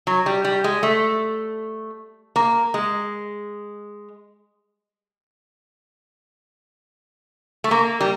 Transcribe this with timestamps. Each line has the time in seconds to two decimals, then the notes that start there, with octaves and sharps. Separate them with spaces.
0.07 F#3
0.26 G3
0.45 G3
0.64 G#3
0.83 A3
2.36 A#3
2.74 G#3
7.64 A3
7.71 A#3
8.01 G3